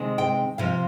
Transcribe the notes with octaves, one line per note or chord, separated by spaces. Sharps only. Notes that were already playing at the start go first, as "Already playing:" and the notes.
Already playing: C3 D#3 G#3 C4
G5
C3 F3 C4 F5